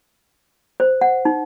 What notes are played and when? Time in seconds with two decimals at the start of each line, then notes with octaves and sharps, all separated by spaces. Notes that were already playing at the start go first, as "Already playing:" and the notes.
0.80 C5
1.01 F#5
1.25 D#4